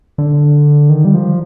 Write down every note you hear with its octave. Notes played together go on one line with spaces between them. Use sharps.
D3
D#3
G3
F3